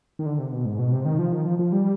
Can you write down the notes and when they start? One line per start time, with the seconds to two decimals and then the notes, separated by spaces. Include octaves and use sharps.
0.19 D#3
0.26 D3
0.39 C3
0.52 B2
0.65 G#2
0.79 B2
0.92 C3
1.05 D#3
1.19 F3
1.32 D#3
1.46 F3
1.59 F3
1.72 G3